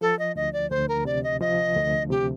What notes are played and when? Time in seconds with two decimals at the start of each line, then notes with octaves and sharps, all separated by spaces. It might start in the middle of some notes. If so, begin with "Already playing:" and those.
0.01 F3 A4
0.19 D#5
0.36 D2 D#5
0.53 D5
0.70 D2 C5
0.88 A#4
1.05 C3 D5
1.24 D#5
1.41 F3 D#5
1.76 D2
2.10 C3 G4